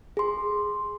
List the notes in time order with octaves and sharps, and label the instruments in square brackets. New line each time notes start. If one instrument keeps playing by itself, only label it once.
[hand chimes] G#4 C6